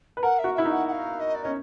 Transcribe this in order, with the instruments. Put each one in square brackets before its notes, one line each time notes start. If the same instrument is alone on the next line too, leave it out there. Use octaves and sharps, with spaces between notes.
[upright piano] B4
[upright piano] A#4 [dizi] F#5
[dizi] E5
[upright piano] F#4
[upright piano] E4 [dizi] E5
[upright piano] D#4
[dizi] F#5
F#5
F5
D#5
D5
[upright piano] C#4 [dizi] D#5